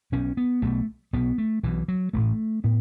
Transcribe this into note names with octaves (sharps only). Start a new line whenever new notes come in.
B1 B2 C#4
B3
B1 B2 A3
B1 B2 B3
A3
B1 B2 E3
F#3
A1 A2 A3
A2 B3